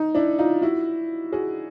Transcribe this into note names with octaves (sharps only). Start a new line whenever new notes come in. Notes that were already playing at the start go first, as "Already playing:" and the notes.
Already playing: D#4
D4 E4
D#4 F4
E4 F#4
F#4 G#4